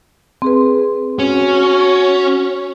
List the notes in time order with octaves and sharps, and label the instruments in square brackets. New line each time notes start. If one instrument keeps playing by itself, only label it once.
[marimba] C4 G#4 B4
[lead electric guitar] C#4 [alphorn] F#4